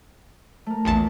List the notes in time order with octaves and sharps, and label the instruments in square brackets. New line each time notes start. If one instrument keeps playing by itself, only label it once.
[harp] A3 A#4
[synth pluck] A#1 E2 A5